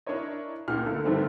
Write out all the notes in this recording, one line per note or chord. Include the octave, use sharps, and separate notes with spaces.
D4 E4 A#4 C#5 D#5
C#2 A#2 F6
D3 A3 A4 A#4
G2 D3 D#3 G3 A3 C4